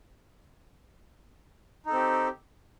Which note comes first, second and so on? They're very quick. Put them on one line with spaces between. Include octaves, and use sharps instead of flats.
D#4 A4 C4 G4